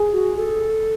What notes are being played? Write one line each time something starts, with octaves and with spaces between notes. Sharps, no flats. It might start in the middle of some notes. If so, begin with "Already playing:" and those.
Already playing: G#4
F#4
A4